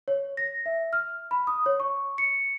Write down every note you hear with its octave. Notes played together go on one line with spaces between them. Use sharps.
C#5
A#6
E5
F6
B5
D#6
C#5
C#6
C#7